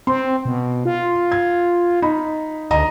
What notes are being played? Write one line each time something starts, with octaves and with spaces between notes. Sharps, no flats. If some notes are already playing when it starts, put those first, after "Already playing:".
C4 C6
B2
F4
G#6
D#4 B5
D2 D#5 A#5